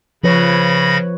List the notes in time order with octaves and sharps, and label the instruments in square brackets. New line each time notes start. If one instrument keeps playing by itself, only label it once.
[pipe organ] C#3 B5 A#6 [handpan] F3 B4 C#5